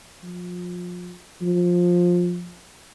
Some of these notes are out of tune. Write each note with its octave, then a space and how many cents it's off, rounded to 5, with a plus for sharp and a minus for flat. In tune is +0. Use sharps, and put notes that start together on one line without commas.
F3 +30
F3 +15